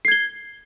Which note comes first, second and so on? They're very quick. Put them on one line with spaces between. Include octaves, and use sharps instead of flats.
C7 G#6 G7